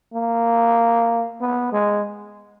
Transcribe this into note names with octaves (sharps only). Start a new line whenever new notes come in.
A#3
B3
G#3